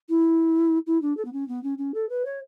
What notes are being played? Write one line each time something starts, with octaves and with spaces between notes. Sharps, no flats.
E4
E4
D4
A4
B3
C#4
B3
C#4
C#4
A4
B4
C#5